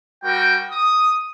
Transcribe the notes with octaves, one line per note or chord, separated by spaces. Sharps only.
G3 F#4 A#4 G5
D#6